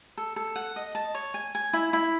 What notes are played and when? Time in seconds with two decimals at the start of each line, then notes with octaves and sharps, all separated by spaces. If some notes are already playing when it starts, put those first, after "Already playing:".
0.17 A4
0.36 A4
0.56 F#5
0.76 D#5
0.95 A5
1.15 C#5
1.34 G#5
1.55 G#5
1.73 E4
1.93 E4